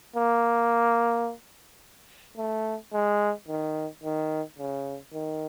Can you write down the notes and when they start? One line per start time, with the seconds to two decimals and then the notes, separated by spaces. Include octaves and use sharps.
0.16 A#3
2.37 A3
2.93 G#3
3.48 D#3
4.03 D#3
4.59 C#3
5.13 D#3